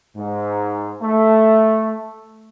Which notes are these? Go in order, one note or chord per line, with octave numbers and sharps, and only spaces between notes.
G#2
A3